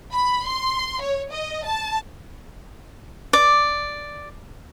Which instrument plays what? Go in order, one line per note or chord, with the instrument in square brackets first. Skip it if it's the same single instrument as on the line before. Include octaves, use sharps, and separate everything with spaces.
[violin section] B5
C6
C#5
D#5
A5
[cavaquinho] D5